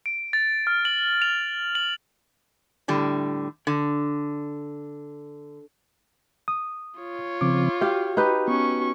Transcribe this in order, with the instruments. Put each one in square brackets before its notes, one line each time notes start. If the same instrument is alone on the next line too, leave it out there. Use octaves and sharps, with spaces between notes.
[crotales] D7
A6
F6
F#7
F7
F#7
[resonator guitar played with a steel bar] A2 D3 G3
D3
[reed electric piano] D#6
[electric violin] F4 C#5
[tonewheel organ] C#3 F3 C4 [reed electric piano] D6
[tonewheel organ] F#4 [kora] G4 F5
[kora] D#4 G4 B4
[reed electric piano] B3 [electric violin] C#4 C#6